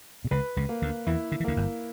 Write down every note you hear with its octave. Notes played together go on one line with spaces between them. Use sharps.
B2
C#2 C#3 B4
C#2 C#3
A#3
D2 D3
E2 E3 E4
D3
E3
D2 D3 A#3
G1 G2